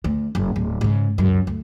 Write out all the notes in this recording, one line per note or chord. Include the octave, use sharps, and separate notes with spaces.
D2
F#1
D1
G#2 C#3
C#2 F#2
D2